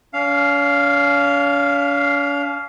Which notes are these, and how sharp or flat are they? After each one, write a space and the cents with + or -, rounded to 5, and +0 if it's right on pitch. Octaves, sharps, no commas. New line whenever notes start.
C#4 +45 F5 -5